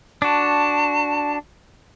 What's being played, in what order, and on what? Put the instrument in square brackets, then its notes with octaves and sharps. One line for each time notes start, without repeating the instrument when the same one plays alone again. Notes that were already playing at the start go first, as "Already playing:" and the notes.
[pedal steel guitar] D4 F#4 [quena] A5